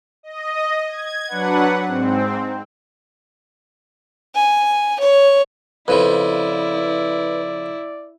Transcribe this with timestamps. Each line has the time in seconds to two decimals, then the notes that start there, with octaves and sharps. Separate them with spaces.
0.23 D#5
0.88 G#6
1.27 F#3 D4 B4 F#5
1.86 G#2 C4
4.35 G#5
5.00 C#5
5.88 F2 C#3 F3 E4 B4 D5